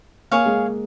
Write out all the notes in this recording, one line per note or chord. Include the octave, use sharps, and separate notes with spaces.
A#3 G#4 C#5 F5
G#3